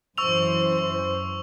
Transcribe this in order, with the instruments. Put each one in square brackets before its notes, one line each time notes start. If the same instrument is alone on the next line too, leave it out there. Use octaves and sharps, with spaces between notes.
[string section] F#2 E3 C5 [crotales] C#6 E6 F7